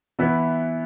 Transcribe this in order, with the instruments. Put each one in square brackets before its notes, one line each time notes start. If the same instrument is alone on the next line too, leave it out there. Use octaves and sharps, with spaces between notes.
[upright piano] E3 B3 E4